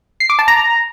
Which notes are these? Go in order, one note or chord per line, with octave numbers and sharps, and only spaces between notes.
C7
D6
A5
A#5